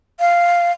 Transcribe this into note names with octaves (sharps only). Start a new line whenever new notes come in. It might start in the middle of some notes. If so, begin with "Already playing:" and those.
F5